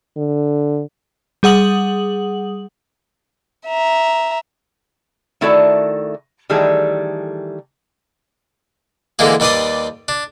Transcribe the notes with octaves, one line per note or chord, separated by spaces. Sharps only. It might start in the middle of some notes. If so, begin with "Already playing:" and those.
D3
G3 G#4 F#5 D#6 F#7
E5 A#5
D#3 A3 E4 F#4 A4 D5
D#3 E3 G3 A3 G#4 A4
D3 E3 G#3 A#3 G#4
D#2 G3 B4 D5 C6 D#6
D4